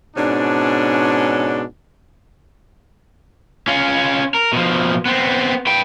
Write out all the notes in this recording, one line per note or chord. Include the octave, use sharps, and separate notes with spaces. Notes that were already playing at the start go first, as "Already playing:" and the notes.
G#2 B2 C#4 D4
C#4 F4
A#4
B2 F3
B3 C4
B4 G5